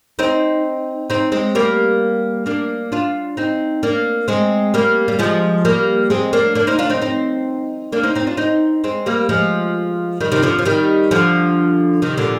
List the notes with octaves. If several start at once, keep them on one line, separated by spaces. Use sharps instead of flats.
C4 D#4
C4 D#4
G#3 C4
G3 A#3
A#3 D4
D4 F4
C4 D#4
A#3 D4
G#3 C4
G3 A#3
G3
F3 G#3
G3 A#3
G#3 C4
A#3 D4
A#3 D4
C4 D#4
D4 F4
C4 D#4
C4 D#4
A#3 D4
C4 D#4
C4 D#4
D4 F4
C4 D#4
G#3 C4
G3 A#3
F3 G#3
D#3 G3
C3 D#3
D3 F3
F3
D#3 G3
D3 F3
C3 D#3
A#2 D3